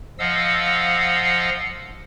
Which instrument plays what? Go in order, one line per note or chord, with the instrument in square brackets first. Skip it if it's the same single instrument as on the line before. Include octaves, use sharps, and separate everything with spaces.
[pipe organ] F3 D#5 F5 F#5 E6